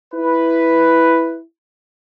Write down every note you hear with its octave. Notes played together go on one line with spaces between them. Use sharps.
E4 B4